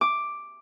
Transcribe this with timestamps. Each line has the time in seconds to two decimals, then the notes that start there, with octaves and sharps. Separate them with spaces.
0.01 D6